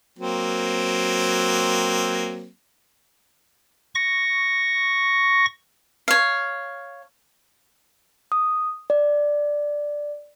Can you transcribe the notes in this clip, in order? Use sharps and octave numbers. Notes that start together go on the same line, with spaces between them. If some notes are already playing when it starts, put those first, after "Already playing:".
F#3 A#3 C4
C#6 A#6
C#5 F5
D#6
D5